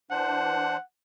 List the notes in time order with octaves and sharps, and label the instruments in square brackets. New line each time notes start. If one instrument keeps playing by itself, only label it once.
[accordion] E3 D4 C5 [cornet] F#5